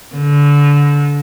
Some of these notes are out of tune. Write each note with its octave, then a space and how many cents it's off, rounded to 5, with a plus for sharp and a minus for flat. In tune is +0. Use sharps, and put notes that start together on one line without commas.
D3 -25